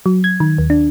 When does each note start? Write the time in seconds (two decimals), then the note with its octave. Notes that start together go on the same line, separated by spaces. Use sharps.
0.06 F#3
0.24 G#6
0.40 D#3
0.58 D#2
0.70 D4